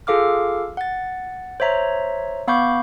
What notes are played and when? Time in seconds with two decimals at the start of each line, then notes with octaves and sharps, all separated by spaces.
0.07 F4 G#4 A4 F5 D6 F6
0.77 F#5 A6
1.60 C5 C#5 E5 A#5
2.48 B3 F5 B5 C#6 D6 G6